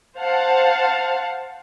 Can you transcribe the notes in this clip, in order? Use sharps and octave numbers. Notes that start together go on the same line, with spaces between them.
C5 F5 F#5 A5